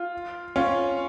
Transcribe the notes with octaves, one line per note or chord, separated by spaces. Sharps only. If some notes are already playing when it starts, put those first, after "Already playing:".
Already playing: F4
C#4 F4